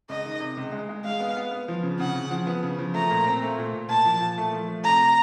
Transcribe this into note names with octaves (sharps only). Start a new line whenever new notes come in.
C#2 D#5
D#3
C3
C#2
G#3
G#3
G#3 F5
B3
B3
B3
F3
C#3
C#3 F#5
C#3
F3
B3
C#3
F3
A3 A#5
A#2
C4
A3
A#2
A#2
A#2 A5
F3
A#2
A3
F3
A3
C3 A#5